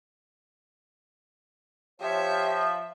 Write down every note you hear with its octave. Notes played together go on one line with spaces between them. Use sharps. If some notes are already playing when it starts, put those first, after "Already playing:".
F3 G4 C5 C#5 E5